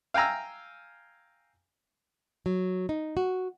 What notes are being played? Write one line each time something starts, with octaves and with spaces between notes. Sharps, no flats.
F5 G5 G#5 A#5 E6
F#3
D#4
F#4